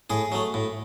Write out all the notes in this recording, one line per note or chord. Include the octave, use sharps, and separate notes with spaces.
A2 G#4
F#3 A3
A2